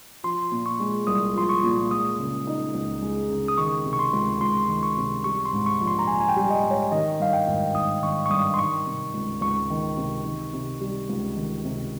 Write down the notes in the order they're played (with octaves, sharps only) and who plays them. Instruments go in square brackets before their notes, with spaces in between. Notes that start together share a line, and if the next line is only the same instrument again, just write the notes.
[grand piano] F3 [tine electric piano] C6
[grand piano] A#2
[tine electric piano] C#6
[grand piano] G#3
[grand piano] C2 [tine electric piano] D#6
[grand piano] F3 [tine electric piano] C6
[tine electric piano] C#6
[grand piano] A#2
[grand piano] G#3 [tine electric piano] D#6
[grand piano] C#3
D#4
C#2
G#3
C#3
[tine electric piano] D#6
[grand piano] D#3 [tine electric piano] C#6
[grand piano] C3
[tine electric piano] C#6
C6
[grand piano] C#2
[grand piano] C#2 [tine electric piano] C6
[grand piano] D#3
[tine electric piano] C#6
[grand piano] C3
[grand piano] G3 [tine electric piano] C#6
[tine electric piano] C6
[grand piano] G#2
[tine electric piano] C#6
[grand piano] A#1
[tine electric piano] C6
A#5
[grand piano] A#1 [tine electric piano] G#5
[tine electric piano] G#5
G5
[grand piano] G3
[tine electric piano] D#5
[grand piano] G#2
[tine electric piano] C#5
[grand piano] D#3 [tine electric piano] D#5
[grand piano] G2 [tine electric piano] F5
[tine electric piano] G5
[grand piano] G#1
[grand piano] G#1 [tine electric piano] D#6
[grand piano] D#3 [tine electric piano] C#6
[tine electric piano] C#6
[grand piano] G2 [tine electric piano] D#6
[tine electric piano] C6
[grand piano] D#3 [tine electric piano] C#6
[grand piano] C3
C#2
[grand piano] C#2 [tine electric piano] C#6
[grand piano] D#3
C3
D#3
C3
G3
C#2
D#3
C3